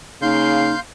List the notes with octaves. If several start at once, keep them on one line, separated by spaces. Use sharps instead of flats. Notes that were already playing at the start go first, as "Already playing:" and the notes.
C#3 A#3 D#4 F5 C6 G6